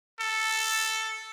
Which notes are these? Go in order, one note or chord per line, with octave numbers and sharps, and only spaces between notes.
A4